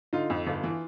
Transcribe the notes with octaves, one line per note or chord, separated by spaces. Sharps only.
D3 D#4 F4
F2
G1
E3